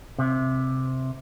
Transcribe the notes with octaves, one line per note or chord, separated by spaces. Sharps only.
C3